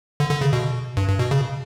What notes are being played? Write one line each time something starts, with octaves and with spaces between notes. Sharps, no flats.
D3
D3
C#3
B2
G2
G2
B2
C#3